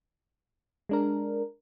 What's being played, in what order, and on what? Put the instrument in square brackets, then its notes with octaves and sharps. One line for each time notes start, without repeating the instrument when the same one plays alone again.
[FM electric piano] G#3 D4 A#4